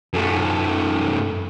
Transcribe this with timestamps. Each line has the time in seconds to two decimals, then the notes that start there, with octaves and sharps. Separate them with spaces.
0.13 F#2 A3